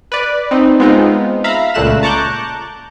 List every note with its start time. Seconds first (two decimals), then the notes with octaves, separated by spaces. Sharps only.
0.12 B4 D5
0.51 C4 D#4
0.80 G#3 B3 C4 D#4 F4
1.44 E5 F5 A#5 B5
1.74 C#2 A#2 A3 F#6 E7
2.03 A5 A#5 C#6 D6 F#6 G6